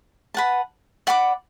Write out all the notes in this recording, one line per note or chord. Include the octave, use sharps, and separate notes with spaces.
B4 F#5 A5
D5 F#5 B5 D6